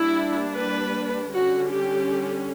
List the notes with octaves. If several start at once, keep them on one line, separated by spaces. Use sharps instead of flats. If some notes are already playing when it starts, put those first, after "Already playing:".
Already playing: G3 A#3 D4 E4
B4
D3 G3 C#4 F#4
G4